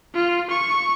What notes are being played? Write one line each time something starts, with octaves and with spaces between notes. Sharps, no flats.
F4
C#6